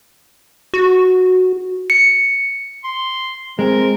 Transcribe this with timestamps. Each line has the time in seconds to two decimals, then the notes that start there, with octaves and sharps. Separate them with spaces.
0.74 F#4
1.90 C#7
2.84 C6
3.59 G#3 C4 A#4